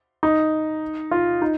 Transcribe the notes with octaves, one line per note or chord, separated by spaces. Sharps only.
D#4
F4
D#4